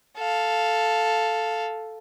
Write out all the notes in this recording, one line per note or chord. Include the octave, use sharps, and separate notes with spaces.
A4 F5